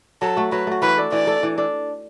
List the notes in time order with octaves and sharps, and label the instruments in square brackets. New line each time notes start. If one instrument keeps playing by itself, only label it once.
[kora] F#3 [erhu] A4
[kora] A3 F#4
[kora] F#3 [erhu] B4
[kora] A3 F#4
[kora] E3 [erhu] B4
[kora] D4 A4
[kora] E3 [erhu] D5
[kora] D4 A4
E3
D4 A4